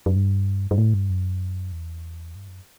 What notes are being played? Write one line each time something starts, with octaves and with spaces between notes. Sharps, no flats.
F#2
G2
G2
A2
G2
F#2
E2
G2
F#2